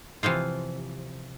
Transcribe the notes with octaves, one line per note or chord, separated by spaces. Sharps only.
C3 E3 F3 F4